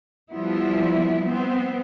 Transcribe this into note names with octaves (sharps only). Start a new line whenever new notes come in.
F3 G3 B3 E4
B3 C4